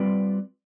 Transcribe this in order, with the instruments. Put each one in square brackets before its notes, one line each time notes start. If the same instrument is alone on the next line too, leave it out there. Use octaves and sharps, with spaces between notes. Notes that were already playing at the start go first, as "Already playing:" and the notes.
Already playing: [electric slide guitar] G3 C4 F4 B4 D5